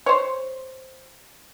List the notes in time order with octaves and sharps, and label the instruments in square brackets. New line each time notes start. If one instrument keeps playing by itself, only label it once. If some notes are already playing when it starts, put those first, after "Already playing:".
[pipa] C5 C#5